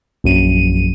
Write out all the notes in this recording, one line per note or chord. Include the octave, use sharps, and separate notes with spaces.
A#1 F#2 D#7